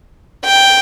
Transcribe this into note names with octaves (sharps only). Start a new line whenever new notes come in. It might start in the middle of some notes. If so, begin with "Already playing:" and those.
G5